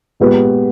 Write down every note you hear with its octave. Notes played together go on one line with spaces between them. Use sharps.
A#2 G#3 B3 G4 B4